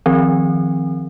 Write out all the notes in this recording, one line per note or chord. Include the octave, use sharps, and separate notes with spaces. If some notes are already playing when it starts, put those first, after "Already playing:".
D#3 F3 C4